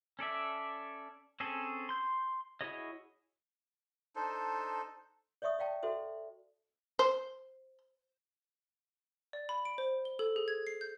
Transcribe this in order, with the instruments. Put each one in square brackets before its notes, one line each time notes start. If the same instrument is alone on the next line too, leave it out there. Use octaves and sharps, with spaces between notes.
[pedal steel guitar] C#4 A4 D5 E5
C4 C#4 G#4 A4
C6 G6
E4 F#4 G#4 C#5 D#5
[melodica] D4 D#4 A4 C5
[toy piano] C#5 D5 E5 C#6 D#6
D5 F5 G5 A5
F#4 A4 C5 E5
[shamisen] C5
[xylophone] D5
B5
D7
C5
G7
A4
G#4
G#6
C7
G6